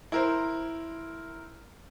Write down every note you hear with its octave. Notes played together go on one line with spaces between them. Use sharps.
E4 A#4 C5